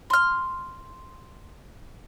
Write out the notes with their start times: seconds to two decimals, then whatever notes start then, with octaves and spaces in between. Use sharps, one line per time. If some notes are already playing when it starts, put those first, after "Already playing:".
0.10 C6 F6